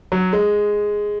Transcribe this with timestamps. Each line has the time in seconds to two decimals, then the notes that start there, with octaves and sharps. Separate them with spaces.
0.12 F#3
0.33 G#3